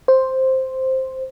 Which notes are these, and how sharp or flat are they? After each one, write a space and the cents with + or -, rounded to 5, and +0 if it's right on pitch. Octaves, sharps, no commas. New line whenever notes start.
C5 +5